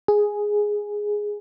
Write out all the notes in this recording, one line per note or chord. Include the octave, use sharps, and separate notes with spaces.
G#4